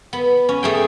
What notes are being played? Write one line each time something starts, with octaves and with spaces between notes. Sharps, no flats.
B3
C#4
A3 G#4 G5